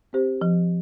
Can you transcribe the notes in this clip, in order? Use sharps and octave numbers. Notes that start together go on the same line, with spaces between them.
C4 G4 C5
F3